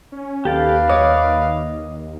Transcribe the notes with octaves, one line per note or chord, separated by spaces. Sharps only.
C#4
D#2 G4 A4 B4 D5 F5 G5
C#5 D#5 D6